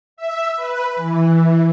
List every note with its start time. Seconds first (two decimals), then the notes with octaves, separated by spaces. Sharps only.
0.17 E5
0.56 B4
0.96 E3